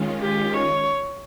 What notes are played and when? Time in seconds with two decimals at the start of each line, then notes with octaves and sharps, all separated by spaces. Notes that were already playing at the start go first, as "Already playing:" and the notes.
Already playing: D#3 G#3 C#4 F4
0.21 G4
0.54 C#5